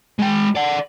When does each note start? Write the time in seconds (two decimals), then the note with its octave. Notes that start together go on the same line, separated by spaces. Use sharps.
0.19 G#3 G5
0.55 D5 F#5